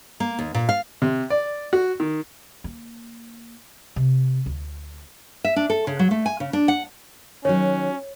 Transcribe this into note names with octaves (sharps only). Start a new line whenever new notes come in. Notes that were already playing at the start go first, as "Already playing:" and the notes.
A#3
D#2
A#2
F5
C3
D5
F#4
D#3
A#3
C3
D2
E5
D4
A4
C#3
F#3
A3
G#5
C#3
D4
F#5
D#3 F#3 C#4 C#5